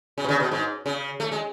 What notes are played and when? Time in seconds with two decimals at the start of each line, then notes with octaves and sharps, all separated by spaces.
0.18 C#3
0.24 B2
0.29 C#3
0.40 B2
0.52 G#2
0.86 C#3
1.20 A3
1.32 G#3